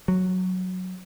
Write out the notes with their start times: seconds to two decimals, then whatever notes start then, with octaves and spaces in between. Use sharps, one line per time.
0.08 F#3